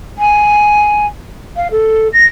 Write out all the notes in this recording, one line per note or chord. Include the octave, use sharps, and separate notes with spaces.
G#5
F5
A4
A#6